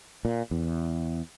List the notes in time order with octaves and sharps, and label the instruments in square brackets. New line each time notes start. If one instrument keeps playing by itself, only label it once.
[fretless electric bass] A#2
E2